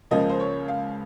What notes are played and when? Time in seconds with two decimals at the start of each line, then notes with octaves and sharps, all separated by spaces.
0.11 C#2 C#3 F3 A#3 D#5
0.29 C5
0.40 C#5
0.68 F5